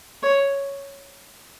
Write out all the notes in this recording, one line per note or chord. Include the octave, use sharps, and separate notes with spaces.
C#5